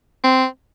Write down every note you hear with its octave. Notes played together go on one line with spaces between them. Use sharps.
C4